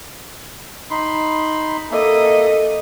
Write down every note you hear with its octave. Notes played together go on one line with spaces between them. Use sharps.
D#4 B5 C6
A#3 A4 D#5 E5